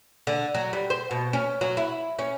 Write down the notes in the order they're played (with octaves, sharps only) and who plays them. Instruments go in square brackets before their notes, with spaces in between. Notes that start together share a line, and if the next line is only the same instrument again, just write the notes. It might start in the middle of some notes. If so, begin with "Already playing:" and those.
[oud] D3
F#3
G3
C5
B2
C#4
F#3
E4
C#4